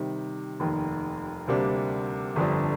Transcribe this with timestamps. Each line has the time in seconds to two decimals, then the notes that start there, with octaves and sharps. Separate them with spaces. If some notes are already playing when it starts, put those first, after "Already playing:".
Already playing: C3 D#3 G3
0.60 F1 D#2 D#3
1.47 D2 C3 G3 A#3 D4
2.36 G1 F2 D3 G3 D4